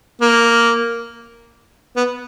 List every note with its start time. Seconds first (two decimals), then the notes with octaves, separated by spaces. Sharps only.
0.21 A#3
1.97 B3